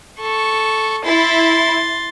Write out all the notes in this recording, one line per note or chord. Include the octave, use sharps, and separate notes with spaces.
A4 C#6
E4 C6 A6